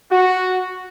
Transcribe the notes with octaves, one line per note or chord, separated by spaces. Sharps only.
F#4